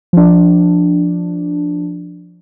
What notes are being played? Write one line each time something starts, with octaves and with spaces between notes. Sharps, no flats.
F3 D4